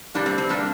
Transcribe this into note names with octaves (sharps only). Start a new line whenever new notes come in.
C3 G3 A#3 D4
C4
C4
C3 G3 A#3 D4